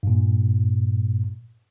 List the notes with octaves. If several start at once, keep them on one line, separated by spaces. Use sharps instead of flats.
G2 A#2